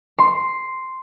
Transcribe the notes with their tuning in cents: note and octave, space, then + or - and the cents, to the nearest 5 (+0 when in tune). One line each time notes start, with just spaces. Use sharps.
C6 +0